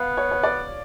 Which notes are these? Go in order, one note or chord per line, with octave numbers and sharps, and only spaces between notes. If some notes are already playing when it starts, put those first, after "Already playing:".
Already playing: B3 F5
C#5
C#5
D5